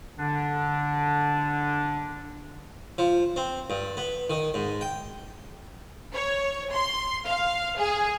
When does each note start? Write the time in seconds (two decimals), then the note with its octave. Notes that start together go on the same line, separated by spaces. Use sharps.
0.19 D3 D4
2.98 F3
3.36 C4
3.70 G2
3.97 B3
4.30 D#3
4.54 G#2
4.81 G5
6.14 C#5
6.73 C6
7.27 F5
7.79 G#4